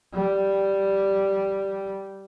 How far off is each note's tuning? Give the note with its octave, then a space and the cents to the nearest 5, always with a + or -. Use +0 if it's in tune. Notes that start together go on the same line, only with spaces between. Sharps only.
G3 -5